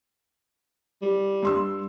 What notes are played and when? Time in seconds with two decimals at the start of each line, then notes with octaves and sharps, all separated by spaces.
1.02 G3
1.43 G2 C6 E6